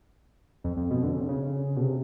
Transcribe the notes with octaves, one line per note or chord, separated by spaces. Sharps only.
F2
F2
B2
D3
C#3
C3
C#3
B2
C3